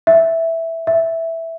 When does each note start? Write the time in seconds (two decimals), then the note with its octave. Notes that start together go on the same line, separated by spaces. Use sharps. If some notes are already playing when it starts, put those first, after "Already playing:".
0.07 E5
0.87 E5